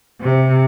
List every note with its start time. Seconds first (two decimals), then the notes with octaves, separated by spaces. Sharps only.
0.22 C3